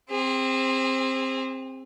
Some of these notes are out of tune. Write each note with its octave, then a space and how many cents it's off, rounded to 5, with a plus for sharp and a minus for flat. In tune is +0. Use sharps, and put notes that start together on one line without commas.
C4 +10 G#4 -30